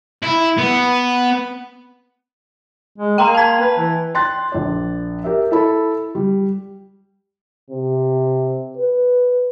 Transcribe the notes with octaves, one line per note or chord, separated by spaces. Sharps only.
E4
B3
G#3
A#3 G5 A#5 C6
A5 G#6
B4
E3
G5 C6 F#6 A6
A#1 D5
G4 A#4 E5
E4 A4 B5
G3
C3
B4